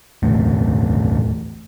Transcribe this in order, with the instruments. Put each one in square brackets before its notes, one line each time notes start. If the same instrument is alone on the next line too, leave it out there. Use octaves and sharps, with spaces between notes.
[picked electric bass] E1 A1 D2 A2